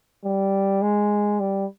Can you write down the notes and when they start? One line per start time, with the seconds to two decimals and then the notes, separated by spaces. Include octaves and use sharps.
0.24 G3
0.82 G#3
1.40 G3